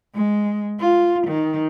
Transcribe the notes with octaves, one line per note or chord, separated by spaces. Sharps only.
G#3
F4
D#3